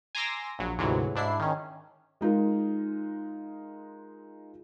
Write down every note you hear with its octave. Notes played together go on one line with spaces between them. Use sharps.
G#5 A#5 C6 D6 E6 A#6
A#1 F#3
D2 G#2 C3 E3 F#3
G#2 D4 E4 C7
D#3 C#4
G#3 D#4 F4 A#4